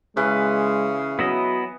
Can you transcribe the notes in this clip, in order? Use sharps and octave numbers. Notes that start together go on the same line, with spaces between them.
C#3 E3 G#3 B4
F#3 B3 E4 D#5